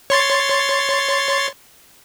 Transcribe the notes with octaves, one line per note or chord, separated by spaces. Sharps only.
C#5 C6 A6